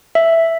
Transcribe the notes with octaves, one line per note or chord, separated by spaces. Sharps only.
E5